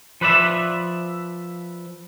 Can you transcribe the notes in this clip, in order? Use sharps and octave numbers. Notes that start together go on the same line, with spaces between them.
F3 B4 D5 E5